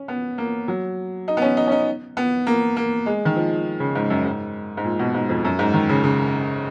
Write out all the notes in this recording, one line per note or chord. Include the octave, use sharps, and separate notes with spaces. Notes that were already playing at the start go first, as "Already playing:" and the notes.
Already playing: C#4
B3
A#3
F#3
D#4
B3
C#4
D#4
C#4
D#4
B3
A#3
A#3
G#3
D#3
F3
C#3
G#2
F#2
G#2
G#2
A#2
B2
G#2
F2
F#2
G#2
D#3
C#3
C#3